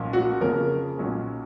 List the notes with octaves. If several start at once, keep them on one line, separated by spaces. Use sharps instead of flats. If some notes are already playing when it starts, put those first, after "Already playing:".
Already playing: B1 A#2 F3 A#3 C#4
F#4
F2 C#3 F3 A#3 C#4 A#4
B1 A#2 F#3 C#4